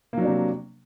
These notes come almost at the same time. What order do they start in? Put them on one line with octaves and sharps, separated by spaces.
A#3 F#3 D4 C3